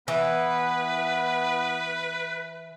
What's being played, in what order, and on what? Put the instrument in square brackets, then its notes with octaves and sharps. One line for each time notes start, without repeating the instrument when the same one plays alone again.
[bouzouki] E3 [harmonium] B3 [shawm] B4